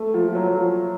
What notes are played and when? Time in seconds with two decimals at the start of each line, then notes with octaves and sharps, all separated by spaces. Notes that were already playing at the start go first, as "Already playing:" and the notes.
Already playing: A3
0.14 F3
0.28 F3
0.35 F#3
0.47 F#3
0.57 F3